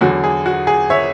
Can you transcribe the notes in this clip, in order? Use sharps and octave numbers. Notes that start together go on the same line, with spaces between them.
E2 D3 F#3 F#4
G#4
F#4
G#4
C#5 E5